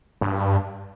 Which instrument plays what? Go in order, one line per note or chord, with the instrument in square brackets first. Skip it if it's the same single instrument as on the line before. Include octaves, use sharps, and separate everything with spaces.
[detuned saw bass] G2